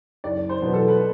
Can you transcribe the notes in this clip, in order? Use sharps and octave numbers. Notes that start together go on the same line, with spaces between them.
F#1 D5
C5
E2 B2 F#3 B3
A4
B4